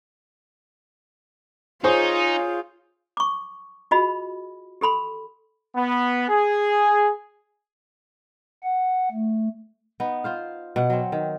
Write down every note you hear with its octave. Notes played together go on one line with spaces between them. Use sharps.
D#4 F4 G#4 C5 C#5
C#6 D6
F4 F#4 G#4 D#5 B5
G4 A4 B5 C6
B3
G#4
F#5
A3
B3 D#4
F4 C5 F5
B2 F#5
F#3 C4
D#3